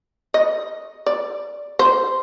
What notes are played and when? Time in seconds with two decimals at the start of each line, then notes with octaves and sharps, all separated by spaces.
0.34 D#5
1.06 D5
1.79 C5